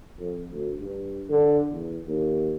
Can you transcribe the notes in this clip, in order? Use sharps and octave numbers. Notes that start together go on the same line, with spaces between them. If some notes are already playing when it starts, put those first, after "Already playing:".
F2
D2
G2
D3
E2
D#2